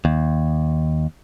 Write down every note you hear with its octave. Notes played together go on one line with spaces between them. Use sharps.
D#2